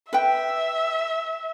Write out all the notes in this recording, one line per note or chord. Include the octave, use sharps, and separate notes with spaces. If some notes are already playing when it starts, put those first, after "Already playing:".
B4 E5 G5